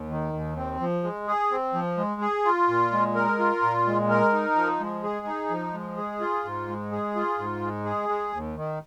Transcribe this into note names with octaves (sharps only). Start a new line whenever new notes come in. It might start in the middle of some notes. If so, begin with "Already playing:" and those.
Already playing: D#2
D#3
D#2
C4
F3
G#3
G#4
C4
F3
G#3
G#4
F4
A#2
G#3
A#4
F4
A#2
G#3
A#4
D#4
F3
G#3
G#4
D#4
F3
G#3
G#4
F4
G#2
G#3
G#4
F4
G#2
G#3
G#4
G#3
D#2
D#3